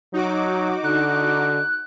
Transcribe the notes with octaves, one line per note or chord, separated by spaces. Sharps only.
F#3 D#4 F#4 D6
D3 F#6